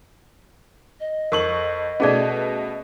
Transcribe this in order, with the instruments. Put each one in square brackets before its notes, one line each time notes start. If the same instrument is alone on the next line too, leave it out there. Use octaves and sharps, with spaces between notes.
[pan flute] D#5
[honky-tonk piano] F2 C#6 F#7 [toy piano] A#4
[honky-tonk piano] B2 A3 B3 [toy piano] C#4 G#4 D5